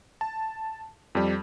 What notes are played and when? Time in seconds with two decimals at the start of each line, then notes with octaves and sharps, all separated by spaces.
0.21 A5
1.15 F2 G3